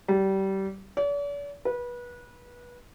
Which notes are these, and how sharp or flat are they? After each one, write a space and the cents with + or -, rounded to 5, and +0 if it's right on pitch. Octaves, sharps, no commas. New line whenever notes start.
G3 -25
D5 -45
B4 -25